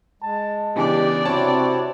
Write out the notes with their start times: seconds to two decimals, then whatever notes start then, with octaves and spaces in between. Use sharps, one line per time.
0.22 G#3 A5
0.76 C#3 E3 B3 D4 G4 D5
1.25 C3 C4 E4 F#4 C#5 A5